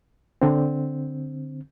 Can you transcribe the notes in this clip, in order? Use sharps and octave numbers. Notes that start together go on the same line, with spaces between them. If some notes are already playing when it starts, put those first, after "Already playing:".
D3 C4